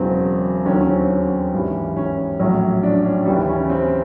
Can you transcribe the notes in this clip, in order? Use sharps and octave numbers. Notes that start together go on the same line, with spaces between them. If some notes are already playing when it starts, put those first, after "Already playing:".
Already playing: E1 E2 C#3 F#3 C4
D#2 D3 F#3 C#4
C#4
C4
C#4
G#1 G2 E3 G3
C#4
A#1 A2 F#3
D4
C#4
D#2 C#3 E3 G3
C#4
C4